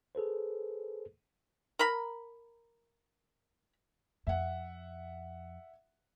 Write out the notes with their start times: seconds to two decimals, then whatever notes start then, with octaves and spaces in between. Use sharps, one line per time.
0.15 G#4 A4 B4 C5
1.79 A#4 A#5 B5
4.27 F2 E5 F#5